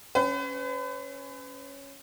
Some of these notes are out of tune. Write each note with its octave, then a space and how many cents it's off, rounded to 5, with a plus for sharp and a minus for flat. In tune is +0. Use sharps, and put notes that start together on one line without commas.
C#4 +0 B4 +40